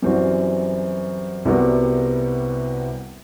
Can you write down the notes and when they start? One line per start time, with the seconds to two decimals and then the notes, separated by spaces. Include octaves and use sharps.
0.02 F#2 E3 G3 C4 F#4
1.45 C2 C3 G3 B3 F#4